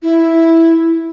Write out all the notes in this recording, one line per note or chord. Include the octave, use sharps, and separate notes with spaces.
E4